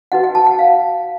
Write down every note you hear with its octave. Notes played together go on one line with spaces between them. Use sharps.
D#4 F#4 B4 F#5
F#5
A5
F#5
F5